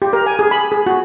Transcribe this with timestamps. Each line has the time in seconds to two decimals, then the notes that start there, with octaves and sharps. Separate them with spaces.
0.02 G4
0.13 A#4
0.26 G#5
0.39 G#4
0.51 B5
0.72 G#4
0.87 F#4